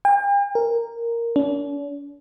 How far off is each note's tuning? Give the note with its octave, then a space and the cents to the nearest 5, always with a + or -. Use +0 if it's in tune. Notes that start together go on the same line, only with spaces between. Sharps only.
G5 +45
A#4 -5
D4 -45